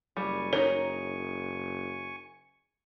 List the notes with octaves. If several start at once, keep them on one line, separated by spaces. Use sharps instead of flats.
F#1 G3 G#5 C#6
D#4 A#4 C#5